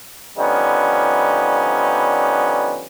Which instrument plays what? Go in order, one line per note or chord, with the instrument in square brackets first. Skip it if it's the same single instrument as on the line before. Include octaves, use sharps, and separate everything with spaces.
[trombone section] D3 F3 G3 B3 C#4 D#4